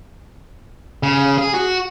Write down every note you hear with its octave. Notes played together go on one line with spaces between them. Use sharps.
C#3
G#4
F#4